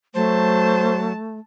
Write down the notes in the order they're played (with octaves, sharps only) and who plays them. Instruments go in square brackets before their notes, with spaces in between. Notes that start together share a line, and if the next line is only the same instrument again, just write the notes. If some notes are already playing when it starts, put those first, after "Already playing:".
[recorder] F#3 [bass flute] A3 [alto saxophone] C5 [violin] A5